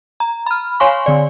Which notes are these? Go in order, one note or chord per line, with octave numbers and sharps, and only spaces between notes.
A#5
B5 F6
C#5 F5 G#5 C6 C#6
D3 D5